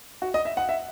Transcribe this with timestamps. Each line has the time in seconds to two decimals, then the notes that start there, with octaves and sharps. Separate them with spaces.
0.22 F#4
0.34 D#5
0.45 E5
0.57 F#5
0.69 E5